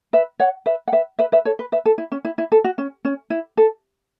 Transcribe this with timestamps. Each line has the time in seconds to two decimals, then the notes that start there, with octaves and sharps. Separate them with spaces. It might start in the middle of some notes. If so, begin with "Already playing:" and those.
0.13 B4 E5
0.40 C#5 F#5
0.66 B4 E5
0.88 F#5
0.92 B4 E5
1.19 B4 E5
1.32 B4 E5
1.45 A4 C#5
1.59 B4
1.72 B4 E5
1.85 A4
1.98 E4
2.12 C#4
2.25 E4
2.38 E4
2.52 A4
2.64 F#4
2.78 C#4
3.05 C#4
3.30 E4
3.57 A4